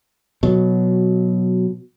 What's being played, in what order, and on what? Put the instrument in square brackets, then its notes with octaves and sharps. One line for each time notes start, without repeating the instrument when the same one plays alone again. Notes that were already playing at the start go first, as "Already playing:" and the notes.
[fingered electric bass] B2 F#3